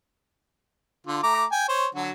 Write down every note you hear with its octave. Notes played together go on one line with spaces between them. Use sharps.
D3 F4
A3 A#5 D6
G5 G#5
C5 C#5
D3 F#3 F#4